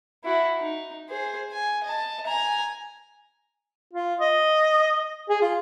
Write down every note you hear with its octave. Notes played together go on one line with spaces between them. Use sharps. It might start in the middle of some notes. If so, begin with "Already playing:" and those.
E4 F#4
D#4
G#4 C5
G#5
D#5 A5
G#5 A#5
F4
D#5
G#4
F4